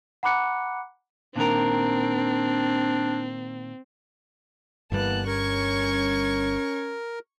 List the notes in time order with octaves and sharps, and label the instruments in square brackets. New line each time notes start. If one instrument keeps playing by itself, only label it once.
[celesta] F#5 A#5 B5 D6 F#6 C#7
[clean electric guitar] A#2 D#3 A#4 [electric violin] C4 [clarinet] D4
[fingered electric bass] G1 G2 G3 [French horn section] E3 A#3 B3 [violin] A5 F#6
[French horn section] C#4 [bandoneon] A#4 [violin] C#6 G#6